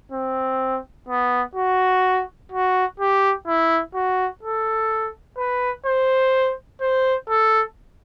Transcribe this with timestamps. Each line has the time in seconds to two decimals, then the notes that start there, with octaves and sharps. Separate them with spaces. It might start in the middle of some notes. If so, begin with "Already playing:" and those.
0.12 C4
1.09 B3
1.55 F#4
2.52 F#4
3.00 G4
3.47 E4
3.94 F#4
4.43 A4
5.38 B4
5.86 C5
6.81 C5
7.29 A4